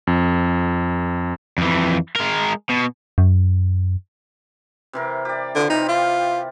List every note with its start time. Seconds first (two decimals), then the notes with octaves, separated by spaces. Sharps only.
0.07 F2
1.58 F2 E3
2.16 G#3 A#4
2.69 B2
3.18 F#2
4.93 C3 E3 A#4
5.25 G4 D5
5.55 D3 E3 F4 G4
5.70 C3 D#4
5.89 F4